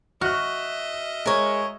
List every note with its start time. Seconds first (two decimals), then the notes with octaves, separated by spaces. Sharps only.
0.21 F#4 D#5 E5 F6 F#6
1.26 G#3 A#4 C#5